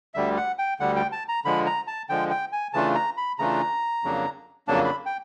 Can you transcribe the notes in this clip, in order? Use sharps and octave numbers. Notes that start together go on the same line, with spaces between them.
D2 D3 G3 E5
F#5
G5
D2 D3 G3 F#5
G5
A5
A#5
D3 F3 G#3 B5
A#5
A5
D3 F3 G#3 G5
G5
G#5
C#3 E3 A3 D4 F4 A5
A#5
B5
C#3 E3 A3 D4 F4 A#5
F2 C#3 F#3 A#3 D4
F2 C#3 F#3 A#3 D4 A5
B5
G5